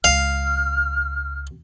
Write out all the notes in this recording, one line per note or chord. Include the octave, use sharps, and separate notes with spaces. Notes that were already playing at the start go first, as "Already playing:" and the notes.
C#2 F5 F6